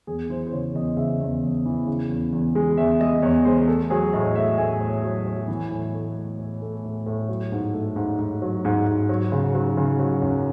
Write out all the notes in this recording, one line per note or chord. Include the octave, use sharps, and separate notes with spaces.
E2 G#4
E3 C5
C5
C#3 C#5
E2 D#5
C#3 E5
E2
E2
E3
C#3
E2
E2
G#3
E2 E5
G#3 D#5
E2 C#5
G#3 C5
A3 A4
F#3 G#4
A2 D#5
A3 E5
A2 G#5
A2
F#3
F#3
E3
A2
A3
A3
A2
A3
A2
A2
F#3
G#2
A3
G#2
G#2
F#3
G#2
G#2
F#3
C#3
F#3
C#3
F#3
F#2